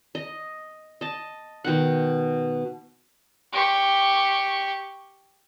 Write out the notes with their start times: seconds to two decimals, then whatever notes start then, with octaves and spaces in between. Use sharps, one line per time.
0.15 D#5
1.01 D#5 A5
1.64 B2 D#3 F#5
3.53 G4 C#6